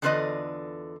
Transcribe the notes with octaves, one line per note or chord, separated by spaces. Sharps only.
E2 D3 F4 B4 D5 D#5